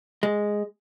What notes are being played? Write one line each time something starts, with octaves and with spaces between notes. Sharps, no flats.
G#3